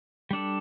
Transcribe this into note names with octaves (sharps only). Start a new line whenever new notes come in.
G3 D4 A4